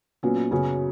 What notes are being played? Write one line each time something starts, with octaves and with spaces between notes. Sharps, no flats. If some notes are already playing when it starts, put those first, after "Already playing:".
A#2 F#3 B3 C#4
F#2 C#3 F#3 B3 C#4